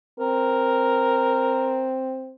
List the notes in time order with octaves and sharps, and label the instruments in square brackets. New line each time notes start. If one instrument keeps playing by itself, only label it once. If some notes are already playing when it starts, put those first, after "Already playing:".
[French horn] C4 [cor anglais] A#4